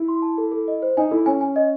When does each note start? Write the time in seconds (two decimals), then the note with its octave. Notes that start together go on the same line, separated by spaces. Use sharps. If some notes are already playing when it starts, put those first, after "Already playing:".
Already playing: E4
0.08 C6
0.22 A5
0.38 A4
0.52 A4
0.68 D#5
0.82 C5
0.97 D#4 G#5
1.11 E4 A4
1.26 C#4 G#5
1.41 G#5
1.56 D#5